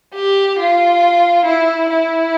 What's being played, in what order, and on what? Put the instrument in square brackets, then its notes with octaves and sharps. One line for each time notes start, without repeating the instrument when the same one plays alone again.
[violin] G4
F4
E4
E4